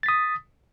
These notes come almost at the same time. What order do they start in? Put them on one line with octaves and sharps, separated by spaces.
A6 B6 D#6